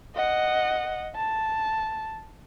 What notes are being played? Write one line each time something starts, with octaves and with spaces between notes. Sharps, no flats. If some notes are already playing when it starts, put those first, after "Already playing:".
D#5 F#5
A5